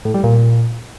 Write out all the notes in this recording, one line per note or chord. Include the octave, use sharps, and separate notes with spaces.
A2
G3
A#2